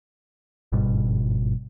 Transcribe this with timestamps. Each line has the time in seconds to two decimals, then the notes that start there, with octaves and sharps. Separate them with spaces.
0.72 G1 G#2 B2 G3